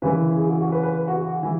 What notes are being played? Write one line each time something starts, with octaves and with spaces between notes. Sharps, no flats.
F#2 C#3 E3 B4
G#4
F#4
F#4
B4
B4
F#4
E3